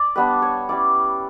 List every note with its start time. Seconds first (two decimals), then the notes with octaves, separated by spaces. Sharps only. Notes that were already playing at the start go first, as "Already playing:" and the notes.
Already playing: D5
0.16 G3 B3 D4 B4
0.42 C#5
0.69 G3 C#4 E4 D5